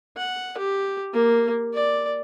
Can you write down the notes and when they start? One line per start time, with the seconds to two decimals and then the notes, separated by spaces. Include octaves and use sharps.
0.17 F#5
0.58 G4
1.13 A#3
1.74 D5